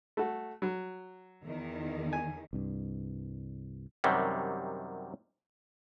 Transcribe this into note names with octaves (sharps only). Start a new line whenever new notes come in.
A3 F#4
F#3
E2 D#3
G#5
C2 G2
F#2 C3 D#3 F#3 G3